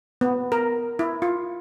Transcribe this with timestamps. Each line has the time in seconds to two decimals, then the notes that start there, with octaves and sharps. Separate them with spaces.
0.21 B3
0.52 A#4
0.99 E4
1.22 F4